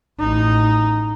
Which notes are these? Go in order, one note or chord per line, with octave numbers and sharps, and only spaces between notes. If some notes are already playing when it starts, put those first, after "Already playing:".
A1 D#4